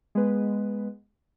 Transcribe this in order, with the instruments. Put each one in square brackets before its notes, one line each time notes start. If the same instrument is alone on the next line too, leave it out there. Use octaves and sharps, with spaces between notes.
[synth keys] G#3 B3 B4